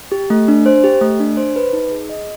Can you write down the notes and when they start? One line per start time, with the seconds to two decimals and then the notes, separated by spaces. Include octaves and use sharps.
0.12 G4
0.30 A3
0.48 D4
0.66 C5
0.84 G4
1.01 A3
1.20 D4
1.37 C5
1.56 B4
1.73 D#4
1.91 G#4
2.09 D#5